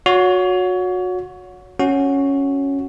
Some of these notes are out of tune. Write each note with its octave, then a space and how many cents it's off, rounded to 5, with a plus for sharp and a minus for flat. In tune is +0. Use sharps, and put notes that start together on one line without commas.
F#4 -25 C#5 +25
C#4 +0 F#4 +0